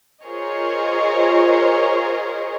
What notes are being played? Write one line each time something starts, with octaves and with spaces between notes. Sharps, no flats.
F4 G#4 A#4 C5 C#5 D#5